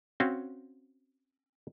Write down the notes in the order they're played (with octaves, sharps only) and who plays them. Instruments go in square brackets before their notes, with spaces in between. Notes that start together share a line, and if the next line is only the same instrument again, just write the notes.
[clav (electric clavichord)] C4 C#4 F#4 F5 G5